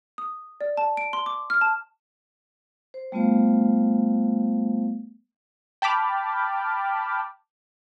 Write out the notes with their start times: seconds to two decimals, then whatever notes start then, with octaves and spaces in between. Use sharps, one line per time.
0.18 D#6
0.61 D5
0.77 A5
0.97 D7
1.13 C6
1.26 D6
1.50 F6
1.61 A5
2.94 C5
3.12 G3 A3 B3 F4 C5 F5
5.82 G5 A5 B5 D6 F6